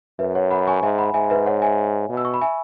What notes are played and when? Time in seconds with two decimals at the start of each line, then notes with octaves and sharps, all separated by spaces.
0.19 F#2 B4 E5
0.35 C#5 F#5
0.51 F#5 B5
0.67 G#5 C#6
0.82 G#2 E5 G#5
0.98 F#5 B5
1.14 G#2 E5 G#5
1.30 B4 E5
1.46 C#5 F#5
1.62 E5 G#5
2.09 B2
2.17 E6
2.25 C#6
2.34 B5
2.41 E5 G#5